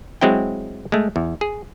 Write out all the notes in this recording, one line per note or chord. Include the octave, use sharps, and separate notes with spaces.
F#3 G#3 C4 E4 G5
G#3 A3
E2
G#4